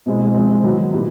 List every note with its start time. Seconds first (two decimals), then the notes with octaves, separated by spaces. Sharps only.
0.06 B2 G#3 C4 E4
0.34 F3 G#3 C4
0.63 D#3 F#3 B3
0.92 A#2 G3 B3 E4